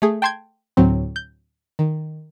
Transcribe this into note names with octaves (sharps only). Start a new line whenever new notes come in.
A3 G#4
G5 A5 C6 G6 G#6
D2 A2 F#3 C4
G6
D#3